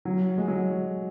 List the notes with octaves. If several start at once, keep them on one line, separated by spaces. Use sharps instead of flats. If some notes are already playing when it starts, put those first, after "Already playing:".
F#3
G#3
F#3